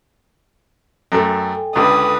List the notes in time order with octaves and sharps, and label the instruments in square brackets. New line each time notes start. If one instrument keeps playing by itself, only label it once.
[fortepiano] F#2 A3 [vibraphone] A4 G5 G#5
[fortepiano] C#2 D3 [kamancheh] B4 D#6